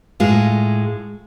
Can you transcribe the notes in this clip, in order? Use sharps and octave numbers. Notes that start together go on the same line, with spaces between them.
A2 G#3 F4